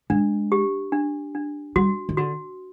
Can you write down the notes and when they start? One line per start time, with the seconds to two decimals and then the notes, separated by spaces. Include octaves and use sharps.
0.10 G#3 D4
0.52 G4
0.92 D4
1.35 D4
1.76 G3 F#4
2.09 D#3
2.17 D3 F#4